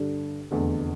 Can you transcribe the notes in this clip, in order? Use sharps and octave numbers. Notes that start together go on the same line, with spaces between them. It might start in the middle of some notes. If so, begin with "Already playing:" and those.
Already playing: G2 D3 G3 D4 A4
F1 E2 D3 A3